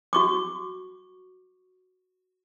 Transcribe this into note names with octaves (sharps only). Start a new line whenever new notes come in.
F#4 C#6 D6